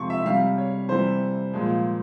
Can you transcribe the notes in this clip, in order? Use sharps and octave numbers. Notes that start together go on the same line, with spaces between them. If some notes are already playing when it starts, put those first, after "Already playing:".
Already playing: C3 F3 G#3 C6 C#6
E5
C3 G3 F5
C#5
C3 E3 G3 C5
A#2 F3 G#3